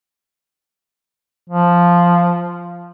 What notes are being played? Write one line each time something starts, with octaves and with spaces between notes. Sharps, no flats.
F3